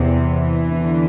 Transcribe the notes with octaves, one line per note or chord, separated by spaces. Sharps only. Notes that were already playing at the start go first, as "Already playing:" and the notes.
Already playing: E2 C3
E3
E2 D3